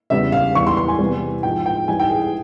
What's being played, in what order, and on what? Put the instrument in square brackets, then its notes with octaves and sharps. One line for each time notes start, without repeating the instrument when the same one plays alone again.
[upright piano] E2 C#3 G3 E5
F5
E2 E3 G3 C#6
C6
C6
G#5
E2 C3 E3 G3
G#2 F3 G#3 G5
G5
G#2 E3 G3 G#5
G5
G#4
G#4